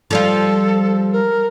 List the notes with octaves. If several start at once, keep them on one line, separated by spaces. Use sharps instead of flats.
F3 G3 F4 A4
A#4